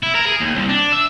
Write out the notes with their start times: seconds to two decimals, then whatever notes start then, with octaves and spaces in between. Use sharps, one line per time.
0.03 E4
0.15 A#4
0.26 G#4
0.40 D#2
0.55 C2
0.69 D4
0.92 E5